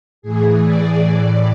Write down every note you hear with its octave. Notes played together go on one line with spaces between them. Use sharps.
A2 E3 G#4
D5
A2 E3